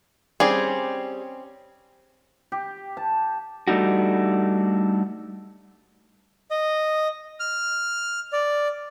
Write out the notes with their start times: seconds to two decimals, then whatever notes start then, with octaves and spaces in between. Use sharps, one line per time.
0.40 G3 C4 C#4 G#4
2.52 G4
2.97 A5
3.68 G3 A3 D4 D#4 F#4
6.51 D#5
7.40 F6
8.33 D5